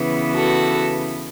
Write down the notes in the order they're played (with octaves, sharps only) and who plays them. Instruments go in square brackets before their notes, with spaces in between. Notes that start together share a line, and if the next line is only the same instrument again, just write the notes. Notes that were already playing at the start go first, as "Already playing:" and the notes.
Already playing: [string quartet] C#3 E3 B3
F#4 A4